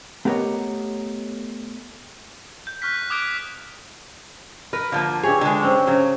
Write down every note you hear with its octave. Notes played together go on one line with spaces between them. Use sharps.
A3 B3 G4 A#4 C#5 D#5
G6
C#6 F6 F#6 B6
D6 D#6 F6 F#6 G#6 D7
A#4 B4
D3 F3 A#3 F4
G2 G4 G#4 C#5
D3 G#3
C4 C#4
C#3 F#3